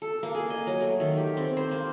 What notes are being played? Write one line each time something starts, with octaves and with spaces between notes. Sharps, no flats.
A4
A#3
G#4
D#5
F#3
A3
D#3
G4
C4
C5
A#3